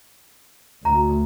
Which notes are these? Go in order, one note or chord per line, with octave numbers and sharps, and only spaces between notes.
D2 A#5